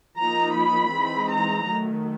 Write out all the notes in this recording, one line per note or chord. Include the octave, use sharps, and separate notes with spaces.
F3 A#3 D#4 A#5
B5
E3 G#3 C4 D#4
A#5
D#3 F#3 A3